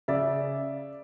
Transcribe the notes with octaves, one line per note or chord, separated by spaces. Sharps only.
C#3 D5 E5